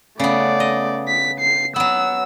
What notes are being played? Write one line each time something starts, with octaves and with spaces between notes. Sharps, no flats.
C#3 A3 B3 D5
D#5
B6
C7
F#3 B3 E6